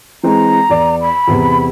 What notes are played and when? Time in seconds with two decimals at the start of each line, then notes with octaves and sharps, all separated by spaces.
0.23 E3 G#3 C4 A#5
0.69 E2 D5
1.01 B5
1.28 E2 C3